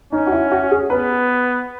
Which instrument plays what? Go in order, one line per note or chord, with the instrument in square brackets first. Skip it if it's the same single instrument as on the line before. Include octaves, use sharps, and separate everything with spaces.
[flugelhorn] C#4 [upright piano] D#4
[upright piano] F#4
E4
F#4
G#4
[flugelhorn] B3 [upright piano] B4